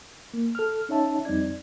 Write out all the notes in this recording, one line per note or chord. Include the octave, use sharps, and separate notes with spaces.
A#3
A4 F6
C#4 D#4 C#5 E5 A5
F2 G3 C4 D#4 D5 G#6